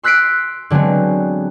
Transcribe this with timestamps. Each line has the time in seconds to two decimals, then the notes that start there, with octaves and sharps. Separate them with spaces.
0.03 C6 E6 F#6 B6 C7 D7
0.70 D3 F#3 G#3 B3 C4